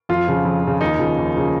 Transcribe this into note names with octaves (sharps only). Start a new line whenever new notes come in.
F2 F4
C#3 F3
F2
C#3 F3
D#2 D#4
C#3 F3
D#2
C#3 F3